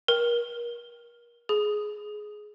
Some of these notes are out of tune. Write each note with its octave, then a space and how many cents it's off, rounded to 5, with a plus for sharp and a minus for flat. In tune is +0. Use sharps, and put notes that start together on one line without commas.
A#4 +35
G#4 +15